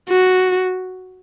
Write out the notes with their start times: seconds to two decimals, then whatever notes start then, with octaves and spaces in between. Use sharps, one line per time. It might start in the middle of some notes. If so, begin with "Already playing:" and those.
0.09 F#4